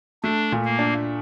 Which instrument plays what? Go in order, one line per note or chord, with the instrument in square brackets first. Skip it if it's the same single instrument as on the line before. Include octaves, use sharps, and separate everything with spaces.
[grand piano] A3 [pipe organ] D4
[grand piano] A#2
[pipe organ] A#3
[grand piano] D4